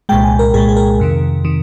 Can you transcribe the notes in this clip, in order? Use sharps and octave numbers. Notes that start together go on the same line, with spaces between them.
C2 A#2 G#3 G5
G#5
A#4
C2 A#2 G#3 G#4
G#4
A#4
F2 C3 D#3
C3 D#3